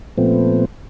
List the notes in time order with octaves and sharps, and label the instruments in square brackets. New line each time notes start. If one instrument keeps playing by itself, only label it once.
[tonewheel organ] A#2 F3 A3 B3 C4